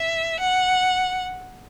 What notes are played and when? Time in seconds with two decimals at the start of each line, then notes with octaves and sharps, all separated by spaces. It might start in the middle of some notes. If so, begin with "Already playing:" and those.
Already playing: E5
0.40 F#5